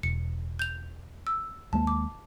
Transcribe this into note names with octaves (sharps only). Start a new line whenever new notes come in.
E1 C#7
G6 F7
E6
D#2 G#3 A#3 A5
D6